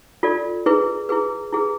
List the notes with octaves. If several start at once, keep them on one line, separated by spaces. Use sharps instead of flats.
F4 A4 D5
E4 G#4 B4
E4 G#4 B4
E4 G#4 B4